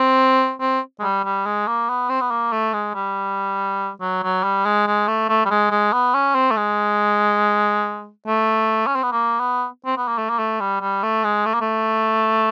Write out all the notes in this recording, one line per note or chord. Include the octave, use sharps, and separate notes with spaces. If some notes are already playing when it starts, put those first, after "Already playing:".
Already playing: C4
C4
G#3
G3
G3
G#3
A#3
B3
C4
B3
A#3
A3
G#3
G3
F#3
F#3
G3
G#3
G#3
A3
A3
G3
G#3
G#3
B3
C#4
C4
A3
G#3
A3
C#4
C4
B3
A#3
B3
C4
B3
A#3
A3
A#3
A3
G3
G3
A3
G#3
A3
A#3
A3